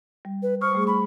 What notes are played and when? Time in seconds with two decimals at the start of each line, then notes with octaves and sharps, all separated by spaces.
0.25 G3
0.43 B4
0.61 C5 C#6 D#6 F6
0.73 G3 A3 G#4
0.87 B5 C#6